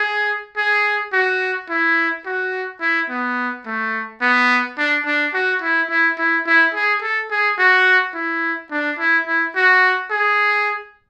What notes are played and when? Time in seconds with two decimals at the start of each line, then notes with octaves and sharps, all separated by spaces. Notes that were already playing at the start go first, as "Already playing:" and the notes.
Already playing: G#4
0.57 G#4
1.13 F#4
1.70 E4
2.26 F#4
2.81 E4
3.10 B3
3.66 A3
4.21 B3
4.78 D4
5.06 D4
5.34 F#4
5.62 E4
5.90 E4
6.18 E4
6.47 E4
6.74 G#4
7.02 A4
7.31 G#4
7.59 F#4
8.14 E4
8.71 D4
8.99 E4
9.27 E4
9.56 F#4
10.11 G#4